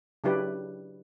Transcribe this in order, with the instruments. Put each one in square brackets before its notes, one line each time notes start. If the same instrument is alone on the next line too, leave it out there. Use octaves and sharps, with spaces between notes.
[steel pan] C#3 F#3 D4 E4 G4 B4